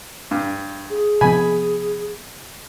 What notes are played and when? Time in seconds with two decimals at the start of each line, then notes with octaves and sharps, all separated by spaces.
0.31 G2
0.90 G#4
1.21 C3 F3 B3 G#5 B5